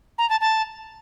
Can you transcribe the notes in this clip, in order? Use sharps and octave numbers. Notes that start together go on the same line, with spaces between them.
A#5
A5
A5